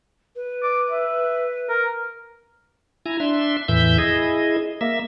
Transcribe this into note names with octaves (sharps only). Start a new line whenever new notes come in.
B4
D6
E5
A#4
E4 G#5 A#5
D4 E5 C6
E2 A2 E3 E5 G6
E4 G#4 D#5
A#3 E5